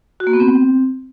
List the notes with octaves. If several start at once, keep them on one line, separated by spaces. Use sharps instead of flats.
F#4
A#3
B3
C4